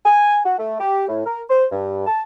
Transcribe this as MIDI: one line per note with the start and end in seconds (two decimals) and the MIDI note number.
0.05 0.39 80
0.45 0.56 66
0.59 0.76 57
0.80 1.07 67
1.08 1.23 45
1.26 1.41 70
1.50 1.65 72
1.71 2.05 43
2.07 2.22 81